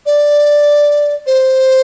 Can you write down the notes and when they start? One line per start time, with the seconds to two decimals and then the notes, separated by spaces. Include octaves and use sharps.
0.06 D5
1.27 C5